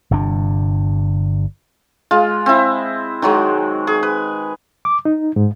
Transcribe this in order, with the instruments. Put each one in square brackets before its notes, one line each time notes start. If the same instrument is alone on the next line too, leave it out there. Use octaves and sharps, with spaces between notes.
[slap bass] G1 G2 C3 D4
[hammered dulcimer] G#3 F4
C4 E4
D#3 F#3 G#3
G#4
B4
[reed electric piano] D6
D#4
G#2